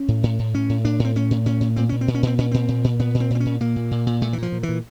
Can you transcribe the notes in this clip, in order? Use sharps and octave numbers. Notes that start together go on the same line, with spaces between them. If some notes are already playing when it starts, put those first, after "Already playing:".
Already playing: C#4
A2
A2
A2
A2 C#4
A2
A2 D4
A2
C4
A2 C#4
A2
A2 C#4
A2
A#2 C4
A#2 C#4
C4
A#2
C#4
A#2 C4
A#2 C#4
A#2 C4
A#2
A#2
A#2 B3
A#2
C4
A#2 C4
C#4
A#2
A#2 A#3
A#2
A#2
A#2
A#2 A3
E3
A#2 F3
A#2
E3
A#2